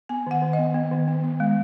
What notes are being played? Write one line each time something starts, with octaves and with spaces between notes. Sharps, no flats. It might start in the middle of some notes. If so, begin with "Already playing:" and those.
B3 G#5
D#3 F#5
D#3
D#5
B3
B3
D#3
B3
B3
G#3